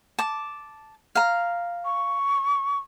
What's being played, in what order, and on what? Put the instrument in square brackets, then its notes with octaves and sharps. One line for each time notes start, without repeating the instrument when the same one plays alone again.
[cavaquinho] A5 D6
F5 A#5
[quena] C#6